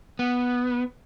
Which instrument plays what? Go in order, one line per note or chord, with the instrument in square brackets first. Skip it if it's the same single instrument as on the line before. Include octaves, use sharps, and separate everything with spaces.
[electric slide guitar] B3